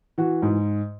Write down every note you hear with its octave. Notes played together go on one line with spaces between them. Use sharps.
E3 F#4
G#2